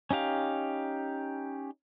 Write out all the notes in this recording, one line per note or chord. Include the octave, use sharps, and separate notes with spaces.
C#4 D#4 G4 F5